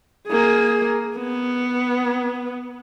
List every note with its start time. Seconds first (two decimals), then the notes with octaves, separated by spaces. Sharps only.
0.27 A#3 G#4
1.18 B3